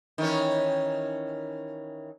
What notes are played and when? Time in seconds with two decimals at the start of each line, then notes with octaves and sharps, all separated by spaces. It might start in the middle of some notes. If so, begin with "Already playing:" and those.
0.18 D#3 E3 C#4